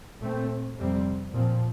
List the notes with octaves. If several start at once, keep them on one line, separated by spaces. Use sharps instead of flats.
A#2 A3 C4
F2 C3 G3 C4
A#2 F3 C4